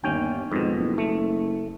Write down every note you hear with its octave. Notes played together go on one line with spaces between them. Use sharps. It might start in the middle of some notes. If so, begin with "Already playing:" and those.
G1 D#2 C#4 G5
F2 G#2 B2
F#1
A3